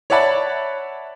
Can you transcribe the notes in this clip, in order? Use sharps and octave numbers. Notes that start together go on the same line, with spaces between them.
C#5 D5 E5 F#5 A5 B5